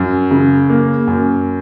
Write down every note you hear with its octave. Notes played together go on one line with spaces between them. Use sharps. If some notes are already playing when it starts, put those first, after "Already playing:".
Already playing: F#2
C#3
A#3
F#2